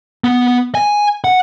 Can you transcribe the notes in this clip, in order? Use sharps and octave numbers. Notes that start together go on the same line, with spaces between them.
B3
G#5
F#5